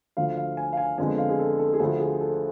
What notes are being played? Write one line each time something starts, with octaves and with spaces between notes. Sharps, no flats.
D2 D3 F3 F5
F5
G#5
F5
G#5
F2 D3 G#3 B3 G#5
F5
G#4
A4
A4
G#4
D2 D3 F3 A4
G#4
A4